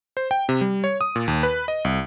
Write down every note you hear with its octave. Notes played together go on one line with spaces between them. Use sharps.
C5
G5
C3
G3
C#5
D#6
A#2
D#2
B4
D#5
C2